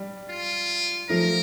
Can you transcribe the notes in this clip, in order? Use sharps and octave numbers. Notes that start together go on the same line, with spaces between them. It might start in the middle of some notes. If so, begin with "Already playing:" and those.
Already playing: G3
F4
F3 A3 A#4